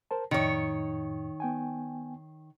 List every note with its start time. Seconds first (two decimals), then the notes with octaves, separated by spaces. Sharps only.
0.11 A#4 C5 A5
0.31 F2 A2 D#3 C#5
1.40 B3 G5 G#5